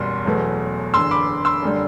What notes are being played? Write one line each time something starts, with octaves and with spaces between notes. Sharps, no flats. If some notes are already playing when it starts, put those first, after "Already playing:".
Already playing: F#1 E2 B2 G3 C6
E1 E2 B2 F#3 A3
F#1 E2 D3 C6 E6
B5 D6
C6 E6
F#1 D3 G3